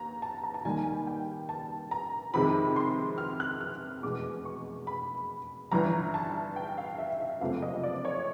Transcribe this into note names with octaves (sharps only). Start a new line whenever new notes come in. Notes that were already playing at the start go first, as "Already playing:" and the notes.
Already playing: D#2 A#5
A5
A#5
A5
D#2 D#3 G3 G#5
G5
A5
A#5
F2 C3 D#3 G#3 B5
C6
F6
F#6
F6
F1 E2 B2 G#3 D6
C#6
B5
G1 G2 E3 A#5
A5
G5
F5
E5
E5
F#1 F2 C3 F3 A3 F5
D#5
D5
C#5